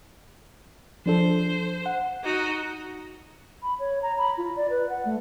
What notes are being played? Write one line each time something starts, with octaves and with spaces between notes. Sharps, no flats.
F3 D4 A4 C5
F#5
D#4 F#4
B5
C#5
A#5
B5
F4
D5
B4
F#5
A3